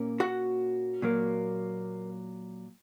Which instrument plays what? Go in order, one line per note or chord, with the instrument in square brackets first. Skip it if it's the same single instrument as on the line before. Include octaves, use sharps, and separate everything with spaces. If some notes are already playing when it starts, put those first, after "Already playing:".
Already playing: [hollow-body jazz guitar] A#2 A#3 C#4
F#4 F#5
A#2 F#3 A#3